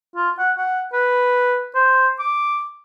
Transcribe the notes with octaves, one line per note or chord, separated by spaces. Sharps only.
F4
F#5
F#5
B4
C5
D6